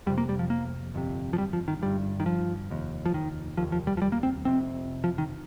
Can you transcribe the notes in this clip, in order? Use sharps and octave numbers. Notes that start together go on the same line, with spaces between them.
F1 F2 C3 G3
A#3
G3
F3
A#3
G1 F2 C3
F3
G3
F3
D#3
G1 G2 G3
D#3
F3
F1 D#2
F3
D#3
F1 D#2 F3
F3
G3
F3
G3
A#3
C4
F1 F2 C3 C4
F3
D#3